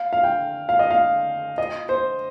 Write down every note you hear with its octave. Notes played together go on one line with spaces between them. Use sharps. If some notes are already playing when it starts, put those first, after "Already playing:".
Already playing: F5
F5
G5
F5
D#5
F5
D#5
C5